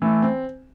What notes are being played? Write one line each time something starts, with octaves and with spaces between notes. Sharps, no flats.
E3 A3
C4